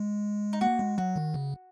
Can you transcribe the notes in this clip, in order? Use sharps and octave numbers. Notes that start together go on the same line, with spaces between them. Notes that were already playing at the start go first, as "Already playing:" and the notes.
Already playing: G#3
D#4
A#3 F#4
G#3
F#3 F#4
D#3
C#3